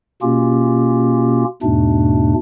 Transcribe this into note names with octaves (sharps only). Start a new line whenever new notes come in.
B2 A#3 C#4 F4 G4
E2 G#2 B2 A3 D4